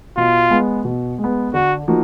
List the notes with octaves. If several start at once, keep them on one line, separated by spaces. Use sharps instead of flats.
B2 F4
G#3 B3
B2
G#3
B3
D3 F#4
F3 A#3 D#4 F#4